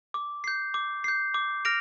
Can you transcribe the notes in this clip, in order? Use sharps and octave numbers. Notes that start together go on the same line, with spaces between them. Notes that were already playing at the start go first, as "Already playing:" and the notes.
D6
G6 C7
D6
G6 C7
D6
F6 A#6 D7 F7